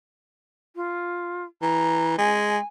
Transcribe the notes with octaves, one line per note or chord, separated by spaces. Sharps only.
F4
E3 A#5
G#3 G#5